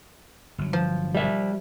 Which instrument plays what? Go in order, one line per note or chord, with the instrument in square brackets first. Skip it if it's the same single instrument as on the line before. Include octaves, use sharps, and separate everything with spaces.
[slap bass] G1 F#3
[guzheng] F3
[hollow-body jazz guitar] G3 E5